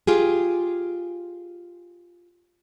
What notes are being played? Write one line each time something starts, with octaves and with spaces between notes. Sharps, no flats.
F4 G4 G#4